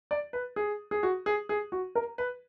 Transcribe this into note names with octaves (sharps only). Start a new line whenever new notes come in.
D5
B4
G#4
G#4
F#4
G#4
G#4
F#4
A#4
B4